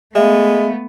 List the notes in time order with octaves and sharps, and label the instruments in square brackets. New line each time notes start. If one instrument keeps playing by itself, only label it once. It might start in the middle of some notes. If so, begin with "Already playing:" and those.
[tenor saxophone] G#3 [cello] A3 B3 [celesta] E5 F5